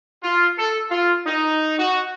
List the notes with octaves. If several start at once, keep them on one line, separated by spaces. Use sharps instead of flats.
F4
A4
F4
D#4
F#4